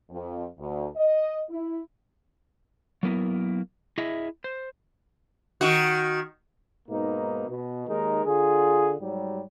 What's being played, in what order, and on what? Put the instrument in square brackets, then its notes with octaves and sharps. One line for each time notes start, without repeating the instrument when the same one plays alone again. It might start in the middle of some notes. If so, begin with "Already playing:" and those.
[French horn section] F2
D2
D#5
E4
[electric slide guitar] F#3 A#3 B3 E4 A#4
E4 G#4 D#5 E5
C5
[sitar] D#3 F#4
[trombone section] G#2 B2 A#3 D#4
B2
D#2 G#3 D#4 A#4
D3 F4 G#4
G#2 F#3 G3